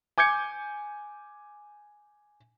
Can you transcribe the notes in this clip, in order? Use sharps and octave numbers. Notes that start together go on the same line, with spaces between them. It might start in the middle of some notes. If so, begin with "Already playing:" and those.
G#5 D6 G6 G#6 C#7